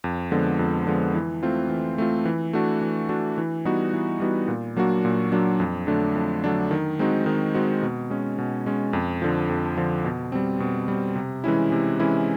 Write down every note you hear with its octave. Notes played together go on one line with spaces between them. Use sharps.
F2
D3 F3 G#3 B3
F2
D3 F3 G#3 B3
E3
A3 C4 F4
E3
A3 C4 F4
E3
A3 D4 F#4
E3
A3 D4 F#4
E3
G3 B3 D#4 F#4
E3
G3 B3 D#4 F#4
A#2
F#3 A#3 D4 F#4
A#2
F#3 A#3 D4 F#4
F2
D3 F#3 A3 D4
F2
D3 F#3 A3 D4
D#3
G#3 C4 D#4 F#4
D#3
G#3 C4 D#4 F#4
B2
G#3 C#4
B2
G#3 C#4
F2
D3 F3
F2
D3 F3
B2
G3 C4
B2
G3 C4
C3
E3 G#3 C#4 E4
C3
E3 G#3 C#4 E4